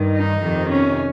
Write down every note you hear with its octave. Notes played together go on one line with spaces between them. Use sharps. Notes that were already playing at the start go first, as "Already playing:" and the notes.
Already playing: G2 D#3
D#4
F2 C3 D#3
C#4